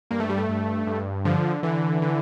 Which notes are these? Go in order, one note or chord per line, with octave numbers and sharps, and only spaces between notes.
G2 A#3
A3
G3
A3
G2
G2
D3 F3
D3 E3
D3